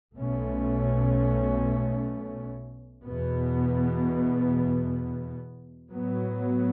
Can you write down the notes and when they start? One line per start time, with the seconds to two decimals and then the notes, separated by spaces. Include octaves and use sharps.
0.18 B1 B2 A3 C#4
3.04 E2 B2 B3
5.91 A2 F#3 B3